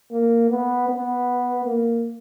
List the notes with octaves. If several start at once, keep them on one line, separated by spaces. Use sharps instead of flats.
A#3
B3
B3
A#3